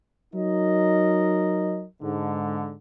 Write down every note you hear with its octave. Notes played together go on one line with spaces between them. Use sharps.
F#3 D#4 A#4 D#5
G#2 D3